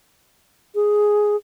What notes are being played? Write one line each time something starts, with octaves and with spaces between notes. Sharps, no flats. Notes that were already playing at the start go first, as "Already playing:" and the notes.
G#4